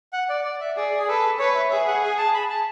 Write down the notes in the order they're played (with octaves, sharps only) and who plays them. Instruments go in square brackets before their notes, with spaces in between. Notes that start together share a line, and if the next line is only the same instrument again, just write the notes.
[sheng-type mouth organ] F#5
D5
D5
E5
[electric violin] G#4 [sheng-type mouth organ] D5
[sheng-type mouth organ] G#4
[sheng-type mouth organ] A4 [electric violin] B4
[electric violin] B4 [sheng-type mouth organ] C#5
[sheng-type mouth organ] E5
[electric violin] G#4 [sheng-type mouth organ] E5
[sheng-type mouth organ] F#5
G#5
A5
B5
A5